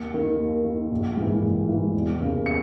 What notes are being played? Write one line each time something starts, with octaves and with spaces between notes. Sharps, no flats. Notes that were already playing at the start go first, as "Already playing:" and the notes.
Already playing: D#2 C#7
D#3
D#2
D#3
A#1
G#2 E3
A#1
G#2 E3
E1
D#2 C#3
C#7